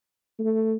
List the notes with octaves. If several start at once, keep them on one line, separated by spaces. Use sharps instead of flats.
A3